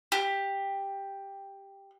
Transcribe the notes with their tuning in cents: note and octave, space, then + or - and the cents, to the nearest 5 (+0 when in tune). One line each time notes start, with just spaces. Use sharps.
G4 +5